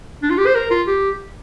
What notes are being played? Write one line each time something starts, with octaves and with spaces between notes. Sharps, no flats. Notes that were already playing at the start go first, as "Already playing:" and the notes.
D4
F4
G4
C5
A#4
F4
G4